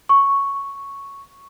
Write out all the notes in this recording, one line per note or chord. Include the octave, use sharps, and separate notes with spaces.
C#6